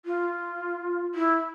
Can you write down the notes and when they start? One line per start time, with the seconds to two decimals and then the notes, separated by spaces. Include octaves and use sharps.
0.05 F4
1.15 E4